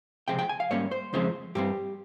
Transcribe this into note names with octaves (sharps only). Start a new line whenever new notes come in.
C#2 C3 F3 G#3 C4 G5
G5
G#5
F5
G#2 G3 A#3 C#4 C#5
C5
F2 C#3 F3 G#3 C4 C5
G2 G3 C4 G4